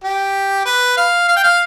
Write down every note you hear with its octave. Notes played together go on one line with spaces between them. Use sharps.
G4
B4
F5
F5
G5
F5